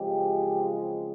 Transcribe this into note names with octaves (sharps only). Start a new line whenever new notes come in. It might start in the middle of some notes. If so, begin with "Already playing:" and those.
Already playing: F#2 C#3 F3 G#3 C4 G4